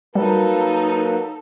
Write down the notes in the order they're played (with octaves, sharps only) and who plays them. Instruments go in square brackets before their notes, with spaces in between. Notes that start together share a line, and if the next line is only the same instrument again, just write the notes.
[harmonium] F#3 A#3 B4 [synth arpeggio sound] G3 [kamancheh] D#4 A4